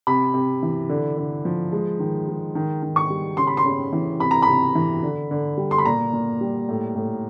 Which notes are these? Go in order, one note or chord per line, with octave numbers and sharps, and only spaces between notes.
C3 B5
C3
E3
D3
D3
F3
G#3
D#3
G#3
D#3
D#3
C#6
G3
C#3 C6
B5
C6
C#3
E3
C3 B5
A#5
B5
C3
E3
D3
D3
G3
C6
B5
A#2 A#5
A#2
G3
A2
A2